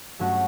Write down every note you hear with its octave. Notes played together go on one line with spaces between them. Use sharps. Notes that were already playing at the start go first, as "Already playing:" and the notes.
G2 F#3 A3 C#4 F#4